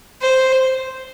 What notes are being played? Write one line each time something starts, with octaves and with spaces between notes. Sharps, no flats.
C5